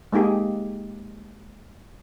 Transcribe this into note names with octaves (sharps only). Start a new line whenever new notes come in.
G#3 A#3 D#4 G4 G#4